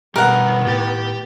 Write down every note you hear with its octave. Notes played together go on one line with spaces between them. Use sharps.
B2 D#3 G3 A3 B3 A#4 F#5
A2 G4 G5 A6